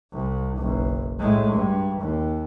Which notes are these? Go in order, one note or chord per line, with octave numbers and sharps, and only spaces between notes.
C2
F#1 B1
A2 G#3
G2
D#2